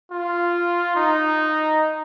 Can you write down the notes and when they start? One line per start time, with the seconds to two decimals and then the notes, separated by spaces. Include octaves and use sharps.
0.12 F4
0.96 D#4